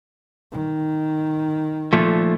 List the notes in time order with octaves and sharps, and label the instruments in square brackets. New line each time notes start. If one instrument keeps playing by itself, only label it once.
[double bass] D#3
[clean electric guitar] A#2 F3 A3